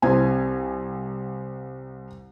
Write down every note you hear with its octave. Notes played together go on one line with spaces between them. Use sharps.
C2 C4 G#5